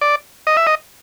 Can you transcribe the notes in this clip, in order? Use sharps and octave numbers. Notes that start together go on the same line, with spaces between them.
D5
D#5
E5
D#5